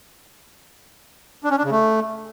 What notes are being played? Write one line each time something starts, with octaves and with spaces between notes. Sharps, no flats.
D4
C#4
D4
C#3
A3